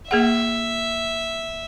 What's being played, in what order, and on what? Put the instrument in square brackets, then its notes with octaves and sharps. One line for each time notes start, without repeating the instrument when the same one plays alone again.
[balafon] A#3 G#4 F#5 [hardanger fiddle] E5